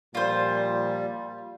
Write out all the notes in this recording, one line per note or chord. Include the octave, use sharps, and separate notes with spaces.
A#2 F3 G3 F4 C5